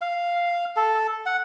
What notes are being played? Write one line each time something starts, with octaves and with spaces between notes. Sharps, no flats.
F5
A4
F#5